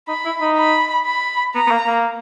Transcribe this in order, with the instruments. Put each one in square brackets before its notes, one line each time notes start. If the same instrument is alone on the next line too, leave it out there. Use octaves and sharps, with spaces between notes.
[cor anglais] D#4 [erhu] B5
[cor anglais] E4
D#4
[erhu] B5
B5
[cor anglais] B3 [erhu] A#5
[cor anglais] B3
A#3
A#3